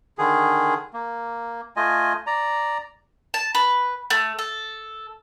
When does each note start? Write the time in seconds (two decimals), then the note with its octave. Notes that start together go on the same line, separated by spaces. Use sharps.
0.18 D3 D#3 G#4
0.94 A#3
1.76 A3 F4 D#5 G#5
2.27 D5 A#5
3.34 A5
3.55 B4
4.10 A3
4.39 A4